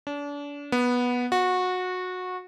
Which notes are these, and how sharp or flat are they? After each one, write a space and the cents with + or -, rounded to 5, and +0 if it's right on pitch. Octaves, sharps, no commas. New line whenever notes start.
D4 -35
B3 -10
F#4 -20